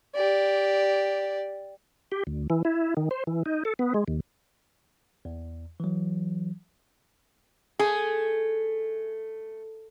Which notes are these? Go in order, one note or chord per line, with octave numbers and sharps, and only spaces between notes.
G4 D5
G4
D2
E3
E4
D#3
C5
E3
D#4
A4
B3
G#3
D#2
E2
E3 F#3
A3 G#4